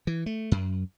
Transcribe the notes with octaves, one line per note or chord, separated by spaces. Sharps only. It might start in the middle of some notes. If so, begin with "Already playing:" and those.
E3
A3
F#2